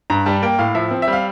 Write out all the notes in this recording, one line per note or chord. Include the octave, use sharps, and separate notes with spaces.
G2 A#5
G3 A5
A#3 G5
A2 F5
F3 E5
C4
E5
G3 F5